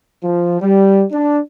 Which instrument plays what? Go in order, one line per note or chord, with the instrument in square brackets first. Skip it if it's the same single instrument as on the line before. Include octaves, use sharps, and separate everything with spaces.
[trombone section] F3
G3
D4